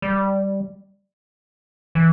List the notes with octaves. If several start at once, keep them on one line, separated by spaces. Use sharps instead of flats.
G3
E3